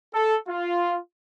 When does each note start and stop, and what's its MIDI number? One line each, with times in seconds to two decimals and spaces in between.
0.14 0.37 69
0.49 0.97 65